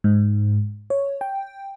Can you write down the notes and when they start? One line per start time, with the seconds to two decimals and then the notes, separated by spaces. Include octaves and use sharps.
0.04 G#2
0.90 C#5
1.21 G5